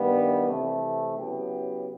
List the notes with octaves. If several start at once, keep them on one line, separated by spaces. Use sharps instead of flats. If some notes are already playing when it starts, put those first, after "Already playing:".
Already playing: G2 D#3 G3 B3
C3 E3 A3 C4
C#3 F#3 B3 E4 G4